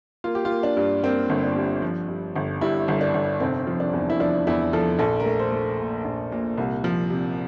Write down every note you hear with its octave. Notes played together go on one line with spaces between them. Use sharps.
A#3 F4
G4
F4
A#3
D4
G2
A#3 C4
G1
D4
G2
F3
G2
G1
G2 E4
G1
D4
G1
F1 C4
F3
D4
E2
E4
F3 D4
E2 E4
F3 A4
A#1 A4
A#4
A3
C5
A3
A#2
A#1
A#2
C2
F3
C3